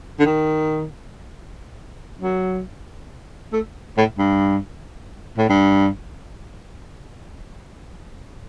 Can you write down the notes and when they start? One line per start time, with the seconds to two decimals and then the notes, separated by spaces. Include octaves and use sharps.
0.20 D3
0.26 D#3
2.22 F#3
3.53 A3
3.97 A2
4.18 G2
5.38 A2
5.49 G2